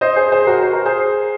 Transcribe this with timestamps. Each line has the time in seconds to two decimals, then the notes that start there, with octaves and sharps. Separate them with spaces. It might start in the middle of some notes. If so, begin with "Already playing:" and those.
0.01 C5 D#5
0.16 G#4 C5
0.31 G#4 C5
0.47 F#4 A#4
0.62 C5
0.73 A#4
0.85 G#4 C5